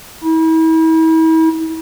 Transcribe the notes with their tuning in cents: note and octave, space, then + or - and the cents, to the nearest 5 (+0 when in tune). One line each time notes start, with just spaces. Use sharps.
E4 -40